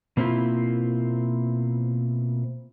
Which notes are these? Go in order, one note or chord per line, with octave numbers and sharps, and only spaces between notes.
B2 A#3 C4 C#4 E4 F4